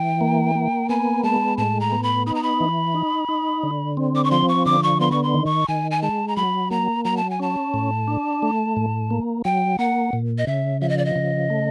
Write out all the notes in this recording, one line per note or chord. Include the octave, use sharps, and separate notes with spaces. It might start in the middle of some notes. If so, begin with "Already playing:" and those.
Already playing: E3 G5
A#3
A#3
B3 G#5
G#3 A5
A2 A5
A#5
B3
B5
D#4 B5
A#5
B5
E3
D#4
D#4
D3
C4
D6
C#6
F3 C6
C#6
D3 D6
C#6
B3 C6
C#6
C6
D#3
C#6
D#3 G#5
G#5
G#3 A5
A#5
F#3 B5
A#3 A#5
F#3 A#5
A5
G#5
C#4 A5
A2
D4
A3
A2
A#3
F#3 G5
A#3 F#5
A#2
D#5
C#3 E5
F3 E5
D#5
D5
D#5
C#3
A3